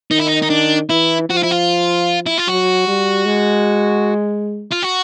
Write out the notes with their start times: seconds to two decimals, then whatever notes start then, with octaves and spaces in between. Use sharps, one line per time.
0.11 D#3 D#4
0.19 E4
0.27 D#4
0.42 D#4
0.50 D4
0.90 E3 E4
1.29 F3 F#4
1.36 F4
1.43 E4
1.51 F4
2.26 E4
2.38 F4
2.47 F#3 F#4
2.87 G3
3.25 G#3
4.72 F4
4.83 F#4